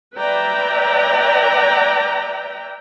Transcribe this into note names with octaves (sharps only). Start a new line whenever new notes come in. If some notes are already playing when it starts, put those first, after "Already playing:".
B4 D5 E5 G5 A#5